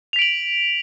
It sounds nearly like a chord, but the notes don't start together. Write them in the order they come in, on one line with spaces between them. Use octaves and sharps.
F7 B6 D7 F#7